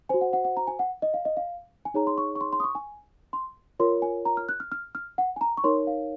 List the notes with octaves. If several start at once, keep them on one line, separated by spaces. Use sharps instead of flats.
F#4 C5 G#5
F#5
F#5
F#5
A#5
G#5
F#5
D#5
F5
D#5
F5
G#5
D#4 G#4 C#5 A#5
C6
C#6
C#6
C6
C6
D#6
C#6
G#5
C6
F4 A#4 C#5 C6
G#5
A#5
F6
F#6
F6
F6
F6
F#5
G#5
A#5
C#6
D#4 A#4 C#5 C6
F5